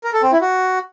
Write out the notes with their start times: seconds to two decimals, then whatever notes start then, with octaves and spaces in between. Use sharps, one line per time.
0.04 A#4
0.13 A4
0.23 C4
0.32 E4
0.41 F#4